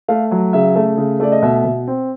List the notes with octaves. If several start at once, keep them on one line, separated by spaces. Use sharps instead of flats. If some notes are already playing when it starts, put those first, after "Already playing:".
A3 F5
F#3
C#3 E5
A3
C#3
A3 D5
D#5
B2 E5
B2
C4